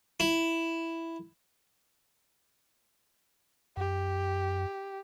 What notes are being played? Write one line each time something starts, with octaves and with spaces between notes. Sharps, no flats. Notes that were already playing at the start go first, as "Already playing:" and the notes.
E4
F#2 G4